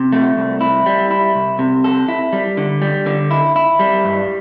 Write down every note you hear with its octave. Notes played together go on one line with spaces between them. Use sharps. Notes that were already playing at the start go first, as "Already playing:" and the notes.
Already playing: C3
A3
C2
E4
G3
E4
C2
C3
A4
E4
G3
D3
G3
D3
E4
E4
G3
G2